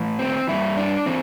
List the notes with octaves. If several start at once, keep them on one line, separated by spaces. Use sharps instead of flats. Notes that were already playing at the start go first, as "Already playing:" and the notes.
Already playing: A2 E3
C4
G2 E3 E4
D4
E3 C4